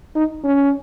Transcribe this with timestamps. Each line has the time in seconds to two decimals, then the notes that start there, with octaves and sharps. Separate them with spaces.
0.16 D#4
0.44 C#4